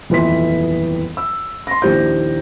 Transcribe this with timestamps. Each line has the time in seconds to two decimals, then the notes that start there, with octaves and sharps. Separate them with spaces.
0.10 D#1 F2 E3 B3 C6 B6
1.17 E6
1.67 C6 A#6
1.82 A#1 D#2 E4 G4 C5 G6